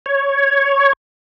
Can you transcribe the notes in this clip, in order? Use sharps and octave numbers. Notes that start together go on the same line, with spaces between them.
C#5